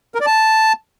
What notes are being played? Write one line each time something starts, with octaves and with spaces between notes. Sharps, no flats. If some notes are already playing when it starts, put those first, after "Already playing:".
A#4
D5
A5